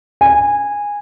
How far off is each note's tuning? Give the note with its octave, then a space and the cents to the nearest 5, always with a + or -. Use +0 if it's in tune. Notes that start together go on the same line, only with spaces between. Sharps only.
G#5 -15